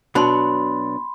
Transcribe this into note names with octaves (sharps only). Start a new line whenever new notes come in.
B2 F#3 D4 B5 C6